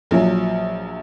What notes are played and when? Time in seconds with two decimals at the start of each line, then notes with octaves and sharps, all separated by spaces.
0.11 A#1 F3 F#3